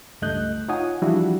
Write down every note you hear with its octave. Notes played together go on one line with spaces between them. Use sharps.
C#2 G2 A3 D#5 F#6 G6
D#4 F4 C#5 F#5 G#5 D#6
E3 F3 G3 D4 E4 F#4